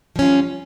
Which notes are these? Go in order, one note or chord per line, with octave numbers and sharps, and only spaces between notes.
F3 G3 C#4 F4